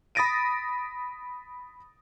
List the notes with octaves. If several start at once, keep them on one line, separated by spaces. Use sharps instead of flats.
B5 D#6 A6 A#6 D7 D#7